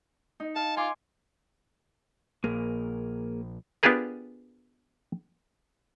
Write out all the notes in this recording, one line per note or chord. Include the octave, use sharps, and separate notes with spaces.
D#4
F5 A5
F4 G#5 C6 D6
A#1 A#3 G#4 A#4
B3 D4 F4 G4 G#4 A#4